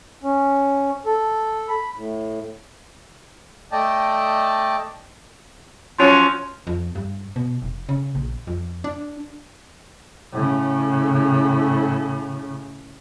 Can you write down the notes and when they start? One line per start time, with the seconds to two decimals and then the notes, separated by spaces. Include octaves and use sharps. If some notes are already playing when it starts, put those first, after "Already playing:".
0.23 C#4
1.06 A4
1.68 B5
1.97 A2
3.72 A3 D5 D#5 G5 A5
5.98 F3 F#3 C#4 C6
6.67 F2
6.95 G2
7.36 B2
7.62 F1
7.89 C#3
8.15 A#1
8.47 F2
8.84 D4
10.32 A2 C#3